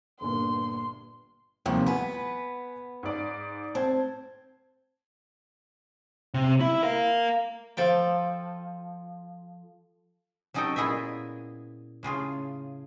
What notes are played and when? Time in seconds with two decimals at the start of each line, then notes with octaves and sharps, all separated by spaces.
0.21 G1 G2 A#2 C6
1.66 D#2 C3 D#3 F3 G3 A#3
1.86 B3 B4 F#5 G#5 B5
3.03 G#2 D5
3.75 C4 A5 G#6
6.34 C3
6.60 E4
6.83 A#4 F5
7.77 F3 A4 G5
10.54 F#3 C#4 D#4 A4 D#5 G5
10.76 A#2 B3 E4 G#4 D#5 E5
12.03 A2 C#3 F4 G#4